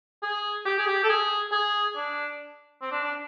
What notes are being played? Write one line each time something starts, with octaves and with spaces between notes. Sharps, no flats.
G#4
G4
G#4
G4
A4
G#4
G#4
D4
C4
D4
D4